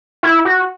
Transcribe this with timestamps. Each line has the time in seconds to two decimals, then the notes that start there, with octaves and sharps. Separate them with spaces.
0.23 E4
0.45 F#4